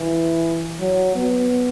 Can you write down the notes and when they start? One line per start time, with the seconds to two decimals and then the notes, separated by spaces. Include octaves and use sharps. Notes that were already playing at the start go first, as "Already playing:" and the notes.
Already playing: E3
0.80 F#3
1.15 B3